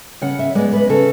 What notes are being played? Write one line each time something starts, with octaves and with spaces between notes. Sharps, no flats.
C#3 F#5
E5
G#3 B3 D5
B4
C#3 A4